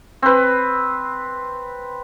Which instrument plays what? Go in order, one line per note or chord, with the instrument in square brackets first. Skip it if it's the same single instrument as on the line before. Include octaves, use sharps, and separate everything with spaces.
[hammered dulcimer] C4 B4